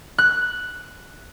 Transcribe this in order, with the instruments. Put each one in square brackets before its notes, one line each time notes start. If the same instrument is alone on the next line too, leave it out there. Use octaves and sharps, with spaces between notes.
[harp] F#6